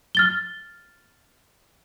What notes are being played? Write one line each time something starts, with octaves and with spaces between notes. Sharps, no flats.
F6 A6 G7